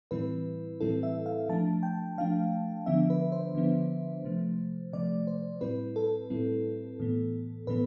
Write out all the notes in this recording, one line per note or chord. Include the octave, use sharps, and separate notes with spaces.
A2 E3 G3 C4 E4 B4
A2 E3 G3 C4 E4 A4
E5
F5
F3 A3 D4 A5
G5
F3 A3 D4 F5
D3 F3 B3 D4 E5
B4
C5
D3 F3 B3 D4
C3 F3 A3
C3 F3 A3 D5
C5
A2 G3 C4 E4 B4
A4
A2 G3 C4 E4
A2 E3 B3
A2 E3 B3 B4